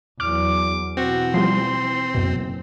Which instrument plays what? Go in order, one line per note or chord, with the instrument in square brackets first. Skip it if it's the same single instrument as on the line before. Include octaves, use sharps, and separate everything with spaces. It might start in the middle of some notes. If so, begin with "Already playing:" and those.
[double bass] E2 F#3 [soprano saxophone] D6 [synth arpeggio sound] F6
[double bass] B2 E3 [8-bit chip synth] C4 [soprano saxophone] F#4
[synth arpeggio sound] F3 G3 [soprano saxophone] C6
[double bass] F#1 [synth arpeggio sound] F#2 B2